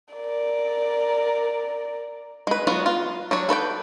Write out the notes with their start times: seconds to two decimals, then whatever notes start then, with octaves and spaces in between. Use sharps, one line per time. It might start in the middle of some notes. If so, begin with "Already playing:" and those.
0.14 A#4 D5
2.47 G#3 B4
2.67 F#3 B3 F4 F#4
2.86 F4
3.31 F#3 D4 C#5
3.49 A4 B4 C#5 G5